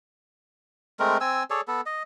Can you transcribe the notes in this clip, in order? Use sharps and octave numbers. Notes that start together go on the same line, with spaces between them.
G#3 A3 C4 A#4
C4 G#5 E6
G#4 A4 C#5 D5
B3 A4
D#5